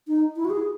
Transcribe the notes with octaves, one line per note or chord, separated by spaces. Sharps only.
D#4
E4
F#4
G#4